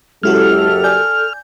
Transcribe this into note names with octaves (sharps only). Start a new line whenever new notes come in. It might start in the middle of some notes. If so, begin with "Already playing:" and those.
F#1 F#2 G#3 E4 F#4 G4 A4 F6
D5 G#5 G6